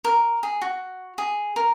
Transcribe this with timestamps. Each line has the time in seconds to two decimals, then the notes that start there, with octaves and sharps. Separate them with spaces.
0.04 A#4
0.43 G#4
0.61 F#4
1.18 G#4
1.56 A#4